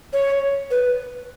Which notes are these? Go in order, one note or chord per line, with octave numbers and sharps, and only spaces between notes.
C#5
B4